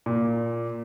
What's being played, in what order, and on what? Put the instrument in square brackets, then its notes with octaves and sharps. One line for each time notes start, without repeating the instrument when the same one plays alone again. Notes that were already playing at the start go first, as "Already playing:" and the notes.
[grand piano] A#2